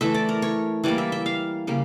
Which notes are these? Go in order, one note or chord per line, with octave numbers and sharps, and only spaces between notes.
E3 A3 E5
D5
A#4
C#5
E3 G3 A#3 D5
E5
E5
F5
C#3 G3 A#3